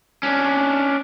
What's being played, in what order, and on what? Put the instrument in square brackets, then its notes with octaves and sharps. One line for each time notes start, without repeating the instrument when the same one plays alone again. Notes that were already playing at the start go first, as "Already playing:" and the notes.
[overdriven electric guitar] C#4 D4